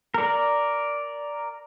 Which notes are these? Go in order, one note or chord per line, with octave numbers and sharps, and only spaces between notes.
A#4 D5